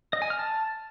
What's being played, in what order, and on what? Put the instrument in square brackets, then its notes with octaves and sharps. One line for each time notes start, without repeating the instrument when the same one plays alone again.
[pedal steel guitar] D#5
G#5
F6
A5